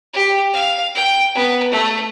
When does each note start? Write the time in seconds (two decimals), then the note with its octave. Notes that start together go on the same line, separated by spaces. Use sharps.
0.14 G4
0.53 F5
0.95 G5
1.34 B3
1.72 A3